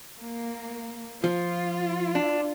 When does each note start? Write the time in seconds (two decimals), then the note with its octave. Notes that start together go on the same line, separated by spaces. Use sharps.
0.20 A#3
1.24 F3 F4
2.15 D4